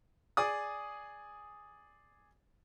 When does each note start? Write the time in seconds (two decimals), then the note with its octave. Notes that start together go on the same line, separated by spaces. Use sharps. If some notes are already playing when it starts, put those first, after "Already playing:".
0.37 G#4 D5 D#6